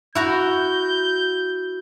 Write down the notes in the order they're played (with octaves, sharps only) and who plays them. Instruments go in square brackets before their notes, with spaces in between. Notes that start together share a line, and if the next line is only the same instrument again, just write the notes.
[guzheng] E4 F#4 A#5 [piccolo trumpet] G6